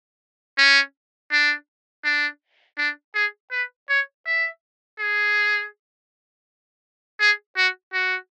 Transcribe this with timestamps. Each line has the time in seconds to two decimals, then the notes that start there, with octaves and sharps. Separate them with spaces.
0.58 C#4
1.32 D4
2.05 D4
2.78 D4
3.15 G#4
3.52 B4
3.89 C#5
4.26 E5
5.00 G#4
7.20 G#4
7.57 F#4
7.93 F#4